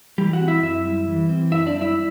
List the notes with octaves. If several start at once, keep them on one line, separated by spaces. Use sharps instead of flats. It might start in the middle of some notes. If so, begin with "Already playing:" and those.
E3 G3 G4
F#4 F#5
C4
E4 E5
F#2 E4 E5
G3
E3
C4
F#2 E4 E5
D4 D5
G3
E4 E5